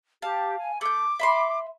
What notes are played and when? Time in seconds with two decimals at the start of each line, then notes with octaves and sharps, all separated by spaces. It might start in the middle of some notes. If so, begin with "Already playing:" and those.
0.22 G4 F5 A5
0.58 G#5
0.81 A3 D6 G6
1.19 E5 B5 C6